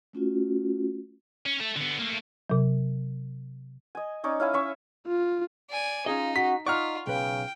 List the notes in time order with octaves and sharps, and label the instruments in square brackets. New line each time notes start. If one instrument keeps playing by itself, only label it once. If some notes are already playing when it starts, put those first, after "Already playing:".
[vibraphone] A3 C#4 F4 F#4
[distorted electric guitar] C#4
A3
D3 B3
A3 A#3
[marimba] C3 F#3
[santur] D#5 G#5
C#4 D#4 C#5 D5
C#4 E4 F5 G#5
C#4 E5 C#6
[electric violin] F4
[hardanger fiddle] D5 G#5
[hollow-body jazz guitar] C#4 G#4 D#5 [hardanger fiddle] D#4 [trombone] F4
[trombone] F#4 [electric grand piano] B6
[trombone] D#4 [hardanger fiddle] F4 [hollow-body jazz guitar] D5 F#5 A#5 [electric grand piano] C#6 F6
[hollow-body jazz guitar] B1 B4 [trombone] C#3 [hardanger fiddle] G5